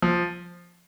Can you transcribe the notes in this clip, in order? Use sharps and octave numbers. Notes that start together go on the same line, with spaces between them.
F3